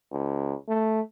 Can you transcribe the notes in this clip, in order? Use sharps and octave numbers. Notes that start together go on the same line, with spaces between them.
C#2
A3